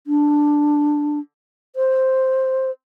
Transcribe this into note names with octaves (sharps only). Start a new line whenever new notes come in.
D4
C5